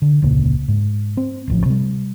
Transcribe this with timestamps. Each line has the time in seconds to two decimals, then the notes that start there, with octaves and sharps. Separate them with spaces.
0.02 D3
0.22 E1 C#2 A#2 C#3
0.68 G#2
1.17 C4
1.47 D1 A1 F3
1.66 C3 G3